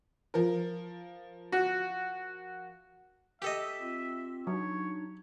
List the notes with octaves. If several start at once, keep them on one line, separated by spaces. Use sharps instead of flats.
F3 A#4
F#4
G4 A4 D#5 E5
C4 F4
F#3 D4 D#4 C#5